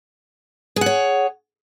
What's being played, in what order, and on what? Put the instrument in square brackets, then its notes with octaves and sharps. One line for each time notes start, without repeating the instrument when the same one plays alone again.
[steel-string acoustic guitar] G#4
F#5
C#5